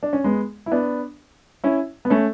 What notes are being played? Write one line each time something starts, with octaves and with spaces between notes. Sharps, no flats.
D4
C#4
G#3 B3
E4
B3 D4
C#4 E4
B3
A3 C#4